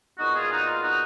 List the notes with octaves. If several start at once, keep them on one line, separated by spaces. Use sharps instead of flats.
A#2 G#3 B3 D#4 F#4
F4 G#4
D#4 F#4
F4
D#4 F#4